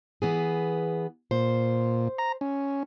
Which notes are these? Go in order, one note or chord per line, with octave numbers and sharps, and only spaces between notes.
E3 B3 G#4
A#2 C5
A#5
C#4